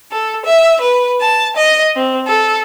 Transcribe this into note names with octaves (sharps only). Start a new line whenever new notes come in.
A4
E5
B4
A5
D#5
C4
A4